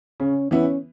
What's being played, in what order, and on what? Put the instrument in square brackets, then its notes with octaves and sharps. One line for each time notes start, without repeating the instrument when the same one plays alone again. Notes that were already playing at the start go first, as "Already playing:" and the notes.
[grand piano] C#3 [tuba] C#4
[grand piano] E3 B3 E4 [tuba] C#4